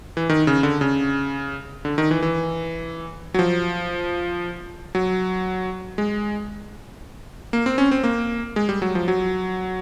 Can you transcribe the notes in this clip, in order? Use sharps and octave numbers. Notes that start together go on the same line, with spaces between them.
E3
D#3
C#3
D3
C#3
D3
D#3
E3
E3
F#3
F3
F#3
G#3
A#3
C4
C#4
C4
A#3
G#3
G3
F#3
F3
F#3